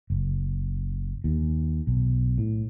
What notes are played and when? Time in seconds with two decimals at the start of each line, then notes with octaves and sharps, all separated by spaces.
0.10 F#1
1.24 D#2
1.87 B1
2.38 A2